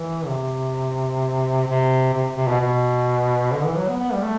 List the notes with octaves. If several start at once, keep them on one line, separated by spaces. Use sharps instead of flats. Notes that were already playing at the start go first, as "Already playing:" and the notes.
Already playing: E3
C3
C3
C3
C3
B2
B2
D3
E3
F#3
B3
B3
G3
A3